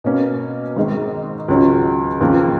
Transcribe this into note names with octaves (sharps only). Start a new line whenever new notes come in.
B2 A#3 C#4
G#1 G#2 D#3 G#3
C#2 C#3 F#3 C#4 F#4
D#2 C#3 F3 A#3